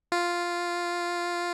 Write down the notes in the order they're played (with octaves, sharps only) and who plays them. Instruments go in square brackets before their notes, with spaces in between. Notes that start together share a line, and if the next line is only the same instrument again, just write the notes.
[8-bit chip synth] F4